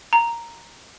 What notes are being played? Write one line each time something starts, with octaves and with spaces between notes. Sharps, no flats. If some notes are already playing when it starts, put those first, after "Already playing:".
A#5